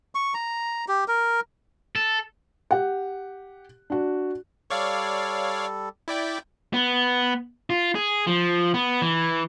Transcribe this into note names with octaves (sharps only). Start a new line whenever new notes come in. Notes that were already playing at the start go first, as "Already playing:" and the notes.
C#6
A#5
G4
A#4
A4
G4 F#5
D4 F#4
G3 A4 C#5 D5 F5
E4 D5 G5
B3
F4
G#4
F3
B3
E3